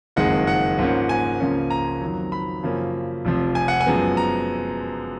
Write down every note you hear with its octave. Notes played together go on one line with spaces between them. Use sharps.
F#1 F2 D#3 G#3 F#5
F#5
G#2 F3 A#3 C#4
G#5
C#2 C#3 F3 A#3 C#4
A#5
F2 D#3 F#3
B5
F#2 C#3 F3 A#3 C#4
F1 F2 F3
G#5
F#5
G#5
F#2 F3 G#3 B3
A#5